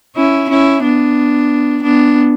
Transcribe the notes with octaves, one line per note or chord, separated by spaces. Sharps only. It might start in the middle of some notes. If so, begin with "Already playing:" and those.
C#4 E4
C#4 E4
B3 D4
B3 D4